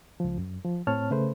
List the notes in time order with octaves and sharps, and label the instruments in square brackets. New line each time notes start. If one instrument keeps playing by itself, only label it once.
[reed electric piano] C#2 F3
F#2
F3
A2 C4 C#5 A5 F6
C#3 A3 B4 C5